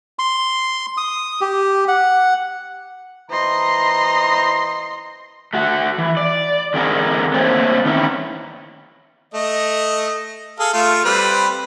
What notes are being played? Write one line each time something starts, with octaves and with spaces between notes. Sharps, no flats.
C6
D#6
G4
F#5
E3 C5 D#5 A#5 C6
A3 F#4
E3
D5
E2 D3 C4 G#4 A#4 G#5
A3 A#3 C4 A4 C5 C#5
D#3 E3 B3 C#4 E4 A#4
A3 D#5
G#4 A4 F5
A3 F4 F5
G3 C4 B4